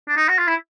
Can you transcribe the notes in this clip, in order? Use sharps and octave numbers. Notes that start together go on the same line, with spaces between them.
D4
D#4
F#4
F4
E4